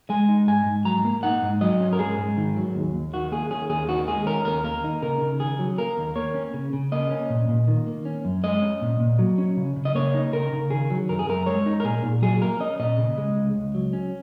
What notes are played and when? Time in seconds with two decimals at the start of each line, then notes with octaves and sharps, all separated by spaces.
0.10 G#3 G#5
0.29 D#4
0.47 G#2 G#5
0.66 G#2
0.85 F#3 A#5
1.05 A#3
1.23 D#4 F#5
1.42 G#2
1.61 F#3 D#5
1.80 C#4
1.93 A#4
1.99 G#2 G#4
2.18 G#2
2.37 D#3
2.57 F#3
2.75 D#2
2.94 D#2
3.13 D#3 F#4
3.32 A#3 G#4
3.50 C#4 G#4
3.70 D#2 G#4
3.88 D#3 F#4
4.08 G#3 G#4
4.26 C#4 A#4
4.45 D#2 A#4
4.64 A#3 A#4
4.84 D#4
5.02 C#3 A#4
5.21 C#3
5.40 D#3 G#4
5.59 F#3
5.78 A#3 A#4
5.97 D#2
6.16 A#3 C#5
6.34 C#4
6.54 C#3
6.73 C#3
6.92 A#3 D#5
7.11 C#4
7.30 A#2
7.49 A#2
7.68 D#3
7.87 A#3
8.05 C#4
8.25 F#2
8.44 G#3 D#5
8.62 C#4
8.81 A#2
9.00 A#2
9.19 F#3
9.38 C#4
9.57 C#3
9.76 C#3
9.85 D#5
9.95 A#3 C#5
10.14 D#4
10.33 C#3 A#4
10.53 C#3
10.71 D#3 G#4
10.90 F#3
11.09 F#2 A#4
11.19 G#4
11.28 F#2 A#4
11.46 G#3 C#5
11.66 D#4
11.80 A#4
11.85 A#2 G#4
12.03 A#2
12.22 F#3 G#4
12.41 A#3 A#4
12.60 C#4 D#5
12.79 A#2 D#5
12.98 C#3
13.18 G#3
13.36 C#2
13.55 C#2
13.75 F#3
13.93 C#4